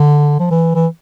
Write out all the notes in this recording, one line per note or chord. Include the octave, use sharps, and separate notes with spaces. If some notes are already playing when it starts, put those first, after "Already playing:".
Already playing: D3
F3
E3
E3